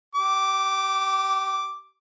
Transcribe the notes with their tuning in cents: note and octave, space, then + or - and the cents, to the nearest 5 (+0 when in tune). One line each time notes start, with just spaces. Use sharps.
G4 -30 D6 +0